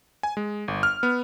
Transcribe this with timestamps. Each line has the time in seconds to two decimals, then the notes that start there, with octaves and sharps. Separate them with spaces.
0.23 G#5
0.37 G#3
0.68 G1
0.83 F6
1.03 B3